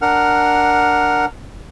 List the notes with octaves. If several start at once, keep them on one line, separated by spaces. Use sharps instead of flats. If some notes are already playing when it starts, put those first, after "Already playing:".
D4 A#4 F#5 F6